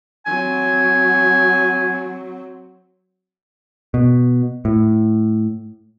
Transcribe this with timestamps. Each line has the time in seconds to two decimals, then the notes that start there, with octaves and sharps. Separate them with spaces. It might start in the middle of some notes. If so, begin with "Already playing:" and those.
0.26 F#3 C4 G#5
3.94 B2
4.65 A2